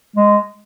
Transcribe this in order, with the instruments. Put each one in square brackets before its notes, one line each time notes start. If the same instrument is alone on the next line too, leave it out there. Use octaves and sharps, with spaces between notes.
[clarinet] G#3